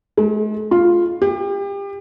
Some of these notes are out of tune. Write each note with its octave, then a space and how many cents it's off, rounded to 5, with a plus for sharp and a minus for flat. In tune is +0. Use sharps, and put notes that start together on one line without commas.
G#3 +45
F4 +0
G4 +30